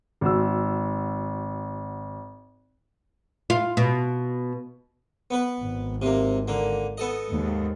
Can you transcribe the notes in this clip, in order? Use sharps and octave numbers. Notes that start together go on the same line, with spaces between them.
G#1 F#4 E6
F4
B2
B3 B4
G#1
C3 A#3
D3 A#3
B3 A4 D#5
D#2 G#2